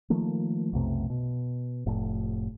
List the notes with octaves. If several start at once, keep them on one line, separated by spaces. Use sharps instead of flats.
D#3 F3 A3 A#3
B1 F2 C3 A3
B2
F1 A2